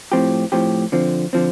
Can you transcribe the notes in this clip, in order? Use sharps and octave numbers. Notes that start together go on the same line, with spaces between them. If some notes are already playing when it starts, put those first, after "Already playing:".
A2 F3 C4 G4
A2 F3 C4 G4
D3 F3 C4
D3 F3 C4